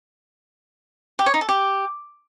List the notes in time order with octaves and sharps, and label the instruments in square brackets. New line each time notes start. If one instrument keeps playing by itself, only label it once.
[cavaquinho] G4
C#5
D#4
A4
G4